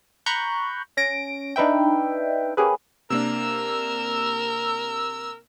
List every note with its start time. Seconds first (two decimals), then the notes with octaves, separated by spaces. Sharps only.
0.26 A#5 B5 C#6 F#6 G6
0.97 C#4 A#6 D7
1.56 D4 D#4 B4 E5 G5
2.57 A#3 C#4 G4 G#4 B4
3.10 C3 A#3 D4 A#4 E6